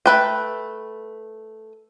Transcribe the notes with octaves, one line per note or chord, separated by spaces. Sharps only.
A3 B4 G5